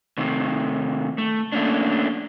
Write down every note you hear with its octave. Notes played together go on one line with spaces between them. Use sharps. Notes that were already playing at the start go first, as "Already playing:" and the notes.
C3 D#3 A3
A3
A3 A#3 C#4 D4